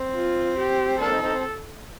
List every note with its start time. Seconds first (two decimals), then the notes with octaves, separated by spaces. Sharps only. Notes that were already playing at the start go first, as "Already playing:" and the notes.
Already playing: C4
0.15 F4
0.58 G4
1.00 A#3 D4 A4
1.11 C4 D#4
1.22 C4 D#4
1.33 C4